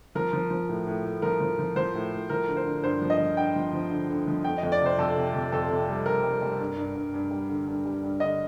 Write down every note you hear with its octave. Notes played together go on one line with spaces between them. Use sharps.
F3 A#4
F3
F3
A2
A2
A2
F3 A#4
F3
F3
F3 C5
A2
A2
F3 A#4
D3
C5
D3
G2 C5
F3
D#5
F3
G2 G5
F3
F3
D3
D3
F3
F2 G5
D#5
F2
D5
C3 C5
F2 A4
C3
F2
F2 A4
C3
G3
F2 A#4
G3
G3
G2
G2
G2
G2
G3
D3
G2
G3
G2
D3 D#5